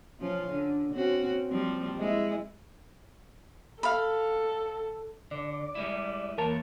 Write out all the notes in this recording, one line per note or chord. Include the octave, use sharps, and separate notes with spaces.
F3 C#4 F4
D3
C4 C#4 F#4
F3 G3 C4
G#3 E4
A4 F5 B5
D3 D5
G3 G#3 E4
E2 A#3 A#4 C#5 A5